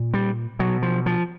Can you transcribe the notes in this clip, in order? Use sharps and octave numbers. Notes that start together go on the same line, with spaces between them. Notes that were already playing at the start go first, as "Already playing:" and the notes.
Already playing: A#2
G3
B2 F#3
F3
F3